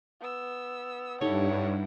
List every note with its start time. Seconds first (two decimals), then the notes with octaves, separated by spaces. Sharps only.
0.21 B3 E6
1.21 G2 D#4 E4 G4 A4 C#5 F#5